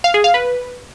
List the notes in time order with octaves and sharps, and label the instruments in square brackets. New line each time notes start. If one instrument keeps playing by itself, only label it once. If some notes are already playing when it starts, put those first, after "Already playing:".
[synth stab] F5
G#4
F5
B4